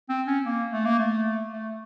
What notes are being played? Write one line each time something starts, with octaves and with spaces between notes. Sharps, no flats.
C4
C#4
A#3
A3
A#3
A3
A3